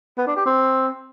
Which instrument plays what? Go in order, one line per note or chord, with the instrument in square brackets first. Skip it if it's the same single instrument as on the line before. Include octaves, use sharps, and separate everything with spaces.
[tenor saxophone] B3
D4
G4
C4